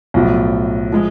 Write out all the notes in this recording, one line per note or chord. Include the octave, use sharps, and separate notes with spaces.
B1 A2 F3
F3 G#3